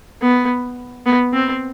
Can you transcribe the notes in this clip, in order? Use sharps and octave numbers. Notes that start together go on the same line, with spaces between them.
B3
B3
C4